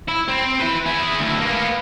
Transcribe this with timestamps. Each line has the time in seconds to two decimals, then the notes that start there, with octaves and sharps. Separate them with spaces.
0.08 E4
0.28 C4
0.60 E4 B4
0.86 E4 G#4
1.19 D2 E4
1.40 A#3 B3